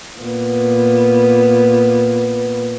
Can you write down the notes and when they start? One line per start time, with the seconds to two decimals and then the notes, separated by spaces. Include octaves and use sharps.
0.20 A#2 B3